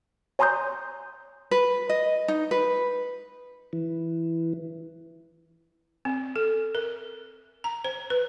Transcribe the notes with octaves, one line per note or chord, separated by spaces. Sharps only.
C#5 G#5 A#5 C6 D#6 G6
B4
D#5
D#4
B4
E3
C4
A4
A#4
A#5
C5
B4